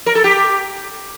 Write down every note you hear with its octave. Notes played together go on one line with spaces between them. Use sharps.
A#4
A4
G4